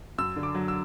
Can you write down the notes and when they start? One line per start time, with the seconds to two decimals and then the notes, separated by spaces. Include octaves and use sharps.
0.18 F#2 E6
0.36 D3
0.43 D6
0.55 F#3
0.68 E6